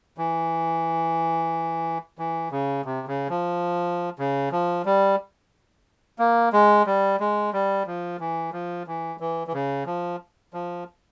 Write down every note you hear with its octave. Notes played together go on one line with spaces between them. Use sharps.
E3
E3
C#3
C3
C#3
F3
C#3
F3
G3
A#3
G#3
G3
G#3
G3
F3
E3
F3
E3
E3
E3
C#3
F3
F3